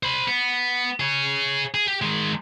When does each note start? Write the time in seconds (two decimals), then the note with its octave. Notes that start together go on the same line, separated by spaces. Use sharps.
0.03 C5 B5
0.28 B3
1.00 G#4 C#5
1.74 G#4
1.87 G4
2.02 D#3 G#3